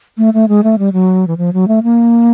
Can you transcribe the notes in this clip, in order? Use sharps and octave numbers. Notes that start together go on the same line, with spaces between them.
A3
A3
G#3
A3
G3
F#3
E3
F3
F#3
A3
A#3